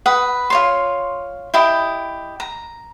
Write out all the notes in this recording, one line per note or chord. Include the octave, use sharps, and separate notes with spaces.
B4 F#5 D#6
F4 C#5 C6
E4 G4 D#5
A#5